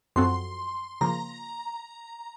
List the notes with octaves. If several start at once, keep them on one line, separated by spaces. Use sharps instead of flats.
F#2 F3 C4 F#4 A4 C6
C#3 F3 A#3 A#5